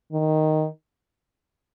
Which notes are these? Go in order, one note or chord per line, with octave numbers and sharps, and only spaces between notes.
D#3